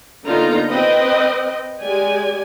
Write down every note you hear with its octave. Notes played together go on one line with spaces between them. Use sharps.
D3 A#3 B3 D#4 F4 A#5
C4 B4 D#5 G5
G#3 G4 D5 G#5